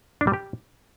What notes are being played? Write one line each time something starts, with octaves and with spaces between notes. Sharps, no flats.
D4
G3
G4